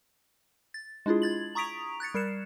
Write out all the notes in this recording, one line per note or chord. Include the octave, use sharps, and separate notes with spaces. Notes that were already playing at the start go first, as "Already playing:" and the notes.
A6
G#3 D4 E4 F4 G#4
G#6 A6 F#7
A#5 C#6 D#6 B6 D7 F7
F#6 G#6 A6 C#7
G3 A#4 C7 C#7 E7